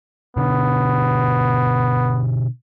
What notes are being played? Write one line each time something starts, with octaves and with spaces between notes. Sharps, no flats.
B2 D3 B3 D4